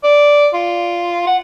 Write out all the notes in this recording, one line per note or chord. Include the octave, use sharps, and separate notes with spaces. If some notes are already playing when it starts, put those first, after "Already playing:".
D5
F4
F#5